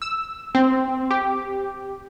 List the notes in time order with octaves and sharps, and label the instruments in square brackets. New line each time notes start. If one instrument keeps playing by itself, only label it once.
[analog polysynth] E6
C4
G4